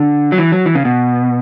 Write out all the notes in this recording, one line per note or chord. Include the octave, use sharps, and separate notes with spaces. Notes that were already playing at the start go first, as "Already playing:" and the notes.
Already playing: D3
F#3
E3
F#3
E3
C#3
B2